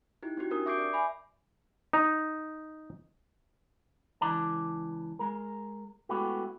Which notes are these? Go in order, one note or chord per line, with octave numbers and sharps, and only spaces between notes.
D#4 E4 G4
C4 F#4 G4
C4 D4 G4 A#4 D#6
E5 C#6 D6 G6 C7 D7
D5 D6
E5 G#5 B5
D#4
C#2 E3 D5 A5
G#3 A#4
G#3 A3 B3 E4 F#4 G4